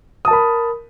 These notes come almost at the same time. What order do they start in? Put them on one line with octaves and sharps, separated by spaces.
D#6 A5 A#4 B5